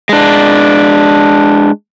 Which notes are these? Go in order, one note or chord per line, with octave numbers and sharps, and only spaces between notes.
G#3 D4